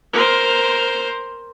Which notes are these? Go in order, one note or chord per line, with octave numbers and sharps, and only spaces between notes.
A#4 C5